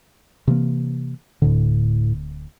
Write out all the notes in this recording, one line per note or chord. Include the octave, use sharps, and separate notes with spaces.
C3 E3 A#3
D1 D2 A2 D3